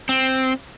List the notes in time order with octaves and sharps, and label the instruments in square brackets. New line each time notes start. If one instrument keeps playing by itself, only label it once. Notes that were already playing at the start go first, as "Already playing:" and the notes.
[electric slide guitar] C4